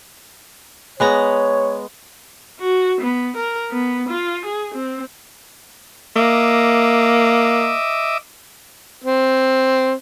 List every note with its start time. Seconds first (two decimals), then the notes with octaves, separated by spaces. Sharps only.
1.00 G#3 B3 C#5 A#5
2.60 F#4
3.01 B3
3.37 A#4
3.71 B3
4.09 F4
4.46 G#4
4.74 C4
6.16 A#3 D#5 E5 D6
9.04 C4